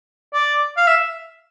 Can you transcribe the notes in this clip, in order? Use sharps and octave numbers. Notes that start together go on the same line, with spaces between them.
D5
F5
E5